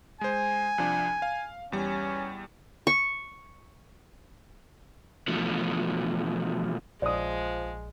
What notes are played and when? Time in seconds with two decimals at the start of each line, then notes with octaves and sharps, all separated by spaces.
0.21 G#3 C5 G#5
0.78 C2 F3 D4
1.22 F5
1.72 E2 G3 C#4
2.87 C#6
5.28 B2 E3 F3 A3
7.02 A#1 F3 G#3 D5 D#6